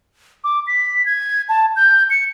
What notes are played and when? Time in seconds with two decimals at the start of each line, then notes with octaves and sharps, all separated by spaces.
0.44 D6
0.67 B6
1.06 G#6
1.49 A5
1.76 G6
2.10 C#7